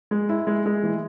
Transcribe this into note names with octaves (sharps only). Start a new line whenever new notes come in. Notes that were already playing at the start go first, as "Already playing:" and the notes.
G#3
E4
G#3
G#3
E3